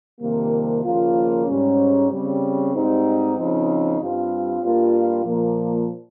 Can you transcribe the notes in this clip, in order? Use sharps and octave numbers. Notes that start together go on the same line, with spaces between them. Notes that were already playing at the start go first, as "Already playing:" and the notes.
F2 C3 D#3 G3 A#3
D#2 C#3 F3 A#3 F4
G#2 G3 C#4
C#3 G3 C4
G#2 G3 C4 D#4 G4
C#3 F3 C4 D#4
G2 G3 C4 F4
G2 G3 A#3 F4
A#2 F3 A#3